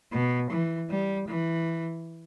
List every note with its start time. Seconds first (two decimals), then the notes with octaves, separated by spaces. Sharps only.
0.12 B2
0.50 E3
0.90 G3
1.28 E3